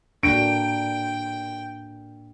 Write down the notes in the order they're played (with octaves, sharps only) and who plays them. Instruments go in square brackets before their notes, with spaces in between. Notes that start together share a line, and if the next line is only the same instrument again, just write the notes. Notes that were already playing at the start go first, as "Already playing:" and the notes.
[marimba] A2 F#4 [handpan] A#3 D4 [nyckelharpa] G5 [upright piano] D7